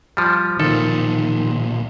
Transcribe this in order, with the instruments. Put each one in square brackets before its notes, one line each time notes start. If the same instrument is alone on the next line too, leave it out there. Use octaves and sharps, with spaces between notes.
[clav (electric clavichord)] F3 G3
[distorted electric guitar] B1 A#2 [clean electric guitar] D#3 F3 [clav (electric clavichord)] A4